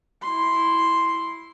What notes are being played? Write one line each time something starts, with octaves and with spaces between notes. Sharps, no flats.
E4 C6